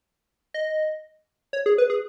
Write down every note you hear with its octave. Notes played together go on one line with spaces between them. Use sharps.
D#5
C#5
G#4
B4
G#4